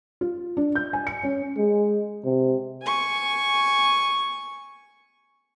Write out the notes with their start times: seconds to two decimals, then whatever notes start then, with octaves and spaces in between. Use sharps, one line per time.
0.21 F4
0.57 D4
0.75 G6
0.93 G#5
1.07 C#7
1.23 C#4
1.58 G#3
2.25 C3
2.82 G#5 C#6